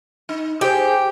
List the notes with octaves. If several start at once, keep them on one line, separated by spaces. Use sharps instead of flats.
D#4
G4 G#4 C5